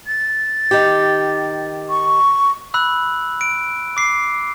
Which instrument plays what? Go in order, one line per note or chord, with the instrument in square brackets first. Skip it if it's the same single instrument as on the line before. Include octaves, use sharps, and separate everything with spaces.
[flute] A6
[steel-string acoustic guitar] D#3 G4
[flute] C#6
[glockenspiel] B5 E6 F#6
D7
D6 C7